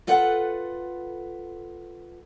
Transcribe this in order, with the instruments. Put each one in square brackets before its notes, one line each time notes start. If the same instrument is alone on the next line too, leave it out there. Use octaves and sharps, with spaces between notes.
[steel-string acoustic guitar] F4 A4 B4 F#5